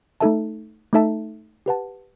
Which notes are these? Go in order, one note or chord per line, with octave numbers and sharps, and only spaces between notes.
A3 D#4 A4 E5 A5
A3 D#4 A4 E5 A5
G4 B4 F#5 A5